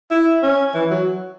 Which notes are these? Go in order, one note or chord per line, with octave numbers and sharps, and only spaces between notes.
E4
C#4
E3
F#3